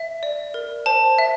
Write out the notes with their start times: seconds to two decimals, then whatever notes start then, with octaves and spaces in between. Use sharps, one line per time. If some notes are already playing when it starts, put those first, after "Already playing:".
Already playing: E5
0.23 D5
0.54 A#4
0.86 C5 A5
1.18 E5